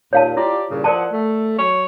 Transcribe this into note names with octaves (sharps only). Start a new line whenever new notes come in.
D#2 A#2 C#5 F5 A5
E4 F4 G4 D5
G2 A#2 C#3
F3 A#4 D5 F#5 A5
A3
F#3 C#5